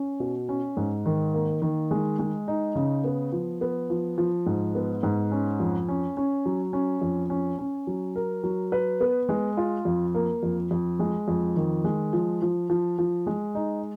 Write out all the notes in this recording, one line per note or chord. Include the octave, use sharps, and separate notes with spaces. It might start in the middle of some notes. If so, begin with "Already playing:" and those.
Already playing: C#4
B2
C#4
G#2
D#3
A#3
D#3
G#3
G#3
D#4
C#3
B3
F3
B3
F3
F3
G#2
B3
G#2
C#4
F2
C#4
C#4
F#3
C#4
F2
C#4
C#4
F#3
A#4
F#3
B4
B3
G#3
F4
F2
A#3
F2
F2
G#3
F2
D#3
G#3
F3
F3
F3
F3
G#3
D#4